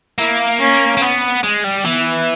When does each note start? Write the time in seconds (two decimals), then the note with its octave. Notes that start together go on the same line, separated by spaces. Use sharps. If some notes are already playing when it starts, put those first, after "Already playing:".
0.18 A#3 E4
0.60 C#4
0.97 A#3
1.02 B3
1.44 G#3
1.64 G3
1.85 E3 B3